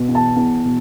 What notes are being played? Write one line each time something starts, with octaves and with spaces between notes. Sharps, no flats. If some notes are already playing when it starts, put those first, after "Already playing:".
Already playing: B2
E2
A5
E2
B2